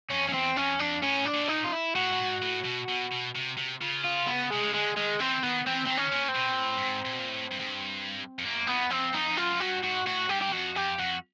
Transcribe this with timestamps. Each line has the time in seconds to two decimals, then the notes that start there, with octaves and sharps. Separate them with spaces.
0.10 F2 C#4
0.27 F2 C#4
0.33 E2 C4
0.57 F2 C#4
0.80 F2 D4
1.03 A2 C#4
1.26 D4
1.34 A#2
1.44 B2
1.49 A#2 D#4
1.64 F4
1.72 E4
1.96 A2 F#4
2.12 A2
2.19 G#2
2.42 A2
2.65 B2
2.89 B2
3.12 B2
3.35 C3
3.57 C3
3.81 C#3 F4
4.04 F4
4.27 B3
4.51 C3 G#3
4.63 C#3
4.74 D3 G#3
4.96 D#3 G#3
5.20 E3 C4
5.43 D#3 B3
5.66 E3 C4
5.85 D#3 E3 C4
5.97 C#4
6.12 A#2
6.28 C4
6.35 B2
6.53 A#2
6.59 A2
6.77 G2
6.82 G#2
7.05 A#2
7.13 B2
7.19 A#2
7.29 A2
7.51 G2
7.59 G#2
7.67 G2
8.39 F2
8.45 F#2 A#3
8.67 E2 B3
8.91 F2 C4
9.13 F2 D#4
9.29 F2
9.37 F#2 F4
9.54 F#2
9.60 G2 F#4
9.83 G#2 F#4
10.06 A2 F#4
10.29 G2 G4
10.42 G4
10.48 E2
10.52 F2 F#4
10.76 F2 G4
10.99 F2 F#4